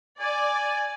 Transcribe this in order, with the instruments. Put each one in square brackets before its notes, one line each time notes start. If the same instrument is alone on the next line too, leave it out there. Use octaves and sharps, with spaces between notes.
[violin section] D5 [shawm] G#5